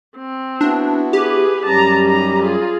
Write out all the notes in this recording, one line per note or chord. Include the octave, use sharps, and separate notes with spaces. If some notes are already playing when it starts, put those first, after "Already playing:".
C4
B3 D4 E4 F#4
G4 G#4 B4
F#2 G3 C#4 A5 A#5
D#4 A#5
F4 G#4